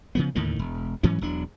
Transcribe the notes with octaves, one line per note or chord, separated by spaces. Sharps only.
C#3 F3 B3
D#2 A2 D3 D#3
E1
G#2 E3 F#3 C#4
E1 E2 F#3 D4